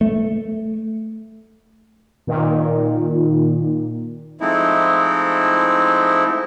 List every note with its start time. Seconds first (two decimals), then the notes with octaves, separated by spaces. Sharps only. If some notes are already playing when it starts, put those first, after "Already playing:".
0.01 A3
2.27 A#2 D#3
4.41 F3 G#3 A3 C4 D#4 E4